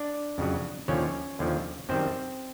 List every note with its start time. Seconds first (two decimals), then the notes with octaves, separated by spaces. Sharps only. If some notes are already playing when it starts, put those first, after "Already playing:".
Already playing: D4 D5
0.38 F2 C#3 F#3
0.88 D#2 D3 F3 C#4 C#5
1.39 D#2 D3 F3
1.89 F#2 D#3 G3 C4 C5